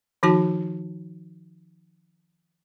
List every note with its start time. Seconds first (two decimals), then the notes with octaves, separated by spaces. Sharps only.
0.23 D#3 F3 D#4 F#4 A5